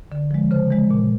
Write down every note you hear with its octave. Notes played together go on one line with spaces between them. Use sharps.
D3
F3 G#3
C#3 C5
E3 G#3
A#2